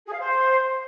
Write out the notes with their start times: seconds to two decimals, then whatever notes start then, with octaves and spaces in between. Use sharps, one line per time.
0.06 G#4
0.13 F5
0.20 C5